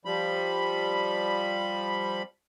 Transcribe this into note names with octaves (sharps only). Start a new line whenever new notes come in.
F3 G3 B5